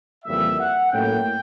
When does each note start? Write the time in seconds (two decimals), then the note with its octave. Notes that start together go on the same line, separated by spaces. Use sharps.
0.25 F2 C#3 E3 G3 A#3 E5
0.58 F#5
0.91 A2 F#3 A#3 C#4 E4 G5